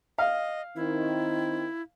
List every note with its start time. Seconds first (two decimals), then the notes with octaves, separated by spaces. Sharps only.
0.18 D#5 F5
0.76 D#3 C4 E4